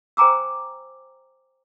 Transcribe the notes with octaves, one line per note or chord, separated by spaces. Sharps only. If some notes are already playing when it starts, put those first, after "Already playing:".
C5 G5 G#5 A#5 D6 E6